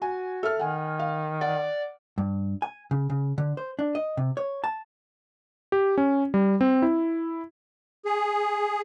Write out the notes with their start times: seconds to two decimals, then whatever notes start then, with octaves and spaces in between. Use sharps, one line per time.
0.02 F#4 G#5
0.43 A4 E5 F6
0.59 D#3 F#5 G#5
0.99 F5
1.41 D5 F#5
2.18 G2
2.62 G#5
2.91 C#3
3.10 C#3
3.38 D3
3.57 C5
3.79 D4
3.95 D#5
4.17 C3
4.37 C#5
4.64 A5
5.72 G4
5.98 C#4
6.34 G3
6.61 C4
6.82 E4
8.05 G#4